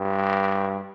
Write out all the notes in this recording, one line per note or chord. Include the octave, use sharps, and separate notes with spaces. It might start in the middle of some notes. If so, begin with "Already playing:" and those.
Already playing: G2